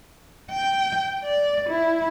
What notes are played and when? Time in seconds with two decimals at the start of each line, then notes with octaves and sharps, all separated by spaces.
0.51 G5
1.24 D5
1.69 E4